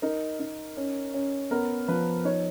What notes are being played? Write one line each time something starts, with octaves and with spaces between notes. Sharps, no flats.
D#4 A#4
D#4
C#4
C#4
B3 A#4
F3 B4
D#4 C#5